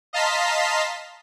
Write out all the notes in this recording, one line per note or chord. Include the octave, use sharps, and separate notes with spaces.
D#5 F5 A5 A#5 C6 B6